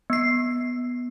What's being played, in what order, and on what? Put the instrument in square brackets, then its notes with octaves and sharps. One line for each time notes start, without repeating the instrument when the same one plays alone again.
[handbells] B3 C7